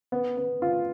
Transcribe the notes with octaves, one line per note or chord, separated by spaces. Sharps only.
B3
B3
F4